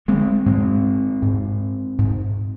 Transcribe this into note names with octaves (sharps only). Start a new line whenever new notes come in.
D3 G#3 C4
G#2 G#3 C4
G#2
G#2